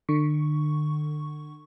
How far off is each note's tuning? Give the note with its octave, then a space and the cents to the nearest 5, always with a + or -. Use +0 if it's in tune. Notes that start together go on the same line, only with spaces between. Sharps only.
D3 +40 C#6 +0